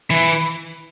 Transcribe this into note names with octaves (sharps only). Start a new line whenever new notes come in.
E3